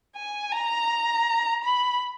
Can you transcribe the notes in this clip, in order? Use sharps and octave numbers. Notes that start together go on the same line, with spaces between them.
G#5
A#5
B5